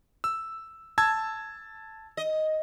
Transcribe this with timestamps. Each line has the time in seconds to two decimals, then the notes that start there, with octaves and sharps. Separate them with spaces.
0.24 E6
0.98 A5 E6 G#6
2.17 D#5